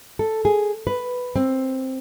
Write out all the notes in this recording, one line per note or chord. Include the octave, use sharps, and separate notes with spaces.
A4
G#4
B4
C4